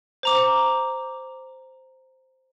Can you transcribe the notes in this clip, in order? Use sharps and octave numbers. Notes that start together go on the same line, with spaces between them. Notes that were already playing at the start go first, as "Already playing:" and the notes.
C5 A#5 D6